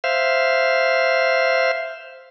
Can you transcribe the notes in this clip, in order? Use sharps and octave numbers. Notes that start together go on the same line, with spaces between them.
C5 E5 F5